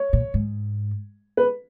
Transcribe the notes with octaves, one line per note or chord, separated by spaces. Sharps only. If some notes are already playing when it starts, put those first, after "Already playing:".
Already playing: C#5
A#2
G#2
B4